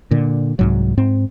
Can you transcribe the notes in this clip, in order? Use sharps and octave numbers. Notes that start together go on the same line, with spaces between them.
A#2 D3
C2 G#2 F#3
G#2 C4